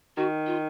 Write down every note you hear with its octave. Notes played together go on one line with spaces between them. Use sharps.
D#3 F#4
F4